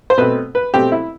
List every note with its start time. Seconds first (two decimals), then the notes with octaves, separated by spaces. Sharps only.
0.10 C5
0.18 B2 A3 C4 B4
0.55 B4
0.74 B2 A3 C4 G4
0.92 E4